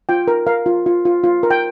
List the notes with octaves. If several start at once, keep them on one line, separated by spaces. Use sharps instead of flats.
F4 G5
A#4
A#4 F5
F4
F4
F4
F4
A#4
G5